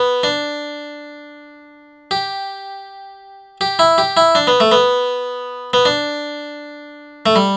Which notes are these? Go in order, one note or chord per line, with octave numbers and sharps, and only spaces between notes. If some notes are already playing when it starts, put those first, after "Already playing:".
Already playing: B3
D4
G4
G4
E4
G4
E4
D4
B3
A3
B3
B3
D4
A3
G3